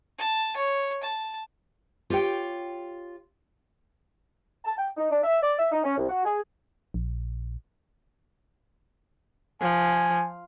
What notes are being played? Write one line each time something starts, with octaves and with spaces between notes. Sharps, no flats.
A5
C#5
A5
F4 G4 C#5 G5
A5
G5
D#4
D4
E5
D5
E5
D#4
C#4
C2
F#4
G#4
A#1
F3 G#5